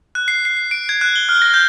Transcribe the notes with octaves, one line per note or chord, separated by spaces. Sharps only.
F#6
C7
C7
C7
D7
G#6
F#6
G7
F6
A#6
G6